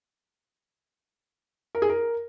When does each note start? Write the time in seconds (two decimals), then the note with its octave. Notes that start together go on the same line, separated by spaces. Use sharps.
1.75 A#4
1.82 G#4
1.89 A#4